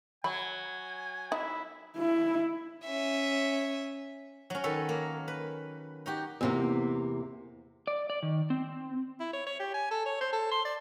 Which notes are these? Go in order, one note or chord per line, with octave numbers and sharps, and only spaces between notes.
F#3 G#5 B5
D#4 E4
E4
C#4 E5
F#3 C#4
D#3 A4 B4 C#5
A#3
B4
D#4 F#4 G4
E2 C3 A#3
D5
D5
D#3
C4
E4
C#5
C#5
G4
G#5
A4
C#5
C5
A4
C6
D5